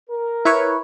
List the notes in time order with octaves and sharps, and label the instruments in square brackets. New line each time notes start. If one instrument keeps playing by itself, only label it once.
[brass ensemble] A#4
[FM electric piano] E4 B4 C#5